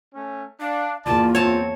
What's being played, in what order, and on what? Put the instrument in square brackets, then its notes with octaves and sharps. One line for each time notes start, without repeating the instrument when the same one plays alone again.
[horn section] A3 C#4
[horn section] D4 [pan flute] F5
[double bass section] E2 A#3 [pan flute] F4 [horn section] D5 A5
[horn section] C4 [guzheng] C#5 A5